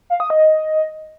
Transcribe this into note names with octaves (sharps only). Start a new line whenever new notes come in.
F5
D#6
D#5